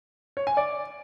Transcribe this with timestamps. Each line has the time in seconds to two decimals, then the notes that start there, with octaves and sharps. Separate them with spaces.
0.37 C#5
0.47 G#5
0.57 D5